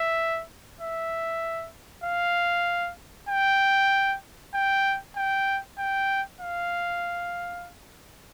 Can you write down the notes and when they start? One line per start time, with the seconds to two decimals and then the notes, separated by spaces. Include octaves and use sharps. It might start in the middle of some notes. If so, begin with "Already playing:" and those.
Already playing: E5
0.81 E5
2.04 F5
3.29 G5
4.54 G5
5.16 G5
5.78 G5
6.41 F5